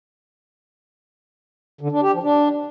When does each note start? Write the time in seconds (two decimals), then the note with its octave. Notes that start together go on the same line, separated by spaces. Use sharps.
1.81 D3
1.91 D4
2.02 G4
2.12 F3
2.23 D4